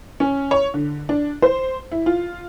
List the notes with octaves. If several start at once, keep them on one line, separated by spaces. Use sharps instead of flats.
C#4
C#5
D3
D4
C5
E4
F4